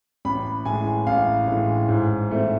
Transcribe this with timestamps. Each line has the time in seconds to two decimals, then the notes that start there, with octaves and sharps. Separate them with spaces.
0.25 A1 B5
0.65 A2 E3 G#3 G#5
1.07 A1 F5
1.47 A2 E3 G#3
1.88 G#2
2.30 E3 A3 C4